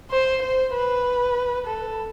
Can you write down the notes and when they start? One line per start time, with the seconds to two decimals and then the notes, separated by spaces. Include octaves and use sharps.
0.11 C5
0.42 C5
0.74 B4
1.67 A4